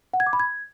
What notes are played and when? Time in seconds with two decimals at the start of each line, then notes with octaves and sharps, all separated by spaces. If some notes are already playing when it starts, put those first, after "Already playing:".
0.14 F#5
0.20 G#6
0.27 D6
0.33 B5
0.40 G#6